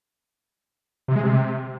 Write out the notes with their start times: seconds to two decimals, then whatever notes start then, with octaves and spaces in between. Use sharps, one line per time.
1.08 C3
1.16 G#3
1.23 C3